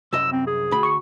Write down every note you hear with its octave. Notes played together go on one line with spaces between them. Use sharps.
C2 F#2 D#5 E6
C4
G#4
D2 B5
C#6